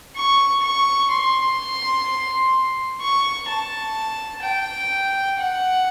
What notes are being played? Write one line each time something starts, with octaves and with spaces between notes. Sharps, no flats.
C#6
C#6
C6
C#6
A5
G5
F#5